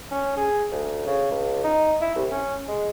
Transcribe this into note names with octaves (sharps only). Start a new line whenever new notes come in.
C#4
G#4
D2
C#3
C#2
D#4
E4
C2
C#4
G#3